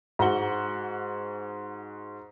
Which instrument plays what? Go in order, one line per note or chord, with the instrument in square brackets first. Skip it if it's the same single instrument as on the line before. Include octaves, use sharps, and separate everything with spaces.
[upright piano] G#2 F#4 F#5 G7